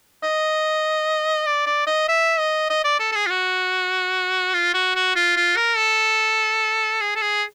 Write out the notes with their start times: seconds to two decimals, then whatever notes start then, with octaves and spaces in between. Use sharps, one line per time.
0.23 D#5
1.46 D5
1.66 D5
1.87 D#5
2.08 E5
2.39 D#5
2.70 D#5
2.84 D5
3.00 A4
3.12 A4
3.16 G#4
3.26 F4
3.30 F#4
4.54 F4
4.74 F#4
4.96 F#4
5.16 F4
5.37 F4
5.57 A#4
5.77 A4
7.01 G#4
7.16 A4
7.22 G#4